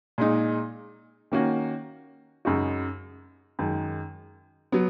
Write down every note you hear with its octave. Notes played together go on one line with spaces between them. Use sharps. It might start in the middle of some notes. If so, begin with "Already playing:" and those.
A#2 G#3 D#4
D#3 A#3 C#4 F#4
F#2 C#3 G#3 D#4 F#4
F#2 D#3 G#3
F#3 B3